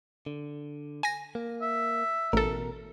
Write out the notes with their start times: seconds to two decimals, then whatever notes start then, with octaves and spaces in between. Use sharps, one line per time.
0.26 D3
1.03 G#5 A#6
1.35 A#3
1.62 E5
2.33 A1 B2 A4 A#4